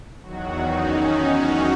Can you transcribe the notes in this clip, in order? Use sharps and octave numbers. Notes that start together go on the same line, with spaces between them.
E2 D#3 F#3 F#4
D#4
C#4
D#4
F#4